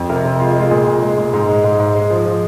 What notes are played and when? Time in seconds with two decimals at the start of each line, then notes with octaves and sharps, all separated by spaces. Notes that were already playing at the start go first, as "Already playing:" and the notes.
Already playing: F2
0.10 C3 A#4
0.25 C3
0.40 G#3 F4
0.56 G#3 F4
0.71 A#2 G#4
0.87 A#2
1.02 G#3
1.18 A#2
1.33 G#2
1.49 G#3
1.64 G#2
1.80 G#2
1.95 G#3
2.10 F3
2.26 F3